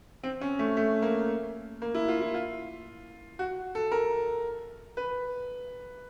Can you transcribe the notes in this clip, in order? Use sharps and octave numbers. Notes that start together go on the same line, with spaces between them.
C4
C#4
A3
A3
A#3
A#3
E4
F4
E4
F4
F#4
A4
A#4
B4